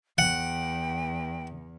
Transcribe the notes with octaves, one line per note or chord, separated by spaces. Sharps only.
E2 F#5 G5